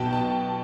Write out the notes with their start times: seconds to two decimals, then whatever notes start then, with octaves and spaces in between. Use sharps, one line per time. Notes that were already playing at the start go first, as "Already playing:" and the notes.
Already playing: B1 B2 G5 A5
0.13 A5